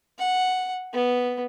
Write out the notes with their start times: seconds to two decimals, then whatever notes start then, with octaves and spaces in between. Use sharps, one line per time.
0.19 F#5
0.93 B3